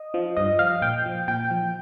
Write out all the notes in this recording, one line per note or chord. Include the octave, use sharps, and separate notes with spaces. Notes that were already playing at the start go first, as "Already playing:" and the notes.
Already playing: D#5
F3
G2 D#5
F3 F5
A#2 G5
F3
A#2 G5
F3